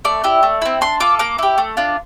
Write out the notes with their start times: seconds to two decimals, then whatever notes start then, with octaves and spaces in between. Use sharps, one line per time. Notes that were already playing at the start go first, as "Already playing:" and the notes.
0.05 A3 D5
0.24 E4 G4
0.43 A3
0.62 C4 E4
0.81 D4 C6
1.00 F4 A4 D6
1.19 A#3 D6
1.38 E4 G4
1.58 A3
1.77 D4 F4